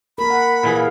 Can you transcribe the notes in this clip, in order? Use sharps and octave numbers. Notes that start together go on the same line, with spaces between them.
A#3 A#4 B5
F#5
A#2 E3 G#4
F5